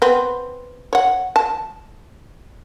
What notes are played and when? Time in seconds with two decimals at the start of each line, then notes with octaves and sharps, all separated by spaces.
0.02 B3 C4
0.93 C#5 F#5
1.36 A5